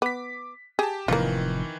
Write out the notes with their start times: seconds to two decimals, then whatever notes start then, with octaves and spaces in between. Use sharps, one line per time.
0.02 B3 D6 B6
0.79 G4 G#4 A5
1.08 F1 F2 A2 D#3 E3 A#3 F4